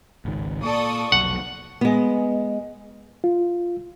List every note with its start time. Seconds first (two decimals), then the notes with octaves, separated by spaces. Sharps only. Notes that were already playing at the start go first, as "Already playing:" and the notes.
0.25 G#1 C#2 D#3
0.63 A#2 A4 D5 C#6 D#6
1.12 F1 B1 F#5
1.81 G#3 B3
3.24 F4